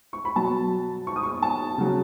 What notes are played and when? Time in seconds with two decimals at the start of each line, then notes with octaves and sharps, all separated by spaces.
0.13 C#6
0.25 B5
0.36 B2 F#3 A5
1.07 C#6
1.16 D#6
1.23 C#6
1.42 A5
1.78 C#3 F#3